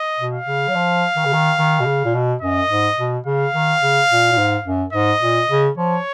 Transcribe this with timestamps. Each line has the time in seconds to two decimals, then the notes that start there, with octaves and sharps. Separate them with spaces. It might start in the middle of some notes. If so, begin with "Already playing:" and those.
Already playing: D#5
0.18 B2
0.33 F5
0.46 C#3
0.68 F#3
0.75 F3
1.16 D#3
1.25 C#3
1.33 D#3
1.58 D#3
1.79 B2
1.85 C#3
2.05 A#2
2.14 B2
2.42 F#2 D#5
2.69 G#2
2.98 B2
3.26 C#3 F5
3.54 D#3
3.81 C#3
4.10 A#2
4.32 A#2
4.37 G#2
4.65 F#2
4.93 G#2 D#5
5.21 A#2
5.49 C#3
5.77 F3 C#5